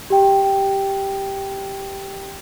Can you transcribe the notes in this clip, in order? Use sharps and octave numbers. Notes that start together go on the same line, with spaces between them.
G4 G5